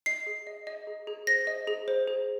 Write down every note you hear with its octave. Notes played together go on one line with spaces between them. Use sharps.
D#5 C7
G#4
D#5
D#5
G#4
G#4
C5 A#6
D#5
G#4
C5
G#4